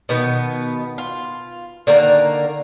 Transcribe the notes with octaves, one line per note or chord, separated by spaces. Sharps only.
B2 D#3 B3
F4
D3 D#3 A#3 A#4